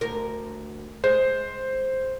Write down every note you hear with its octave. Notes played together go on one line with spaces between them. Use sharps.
D2 A#4
G#3 C5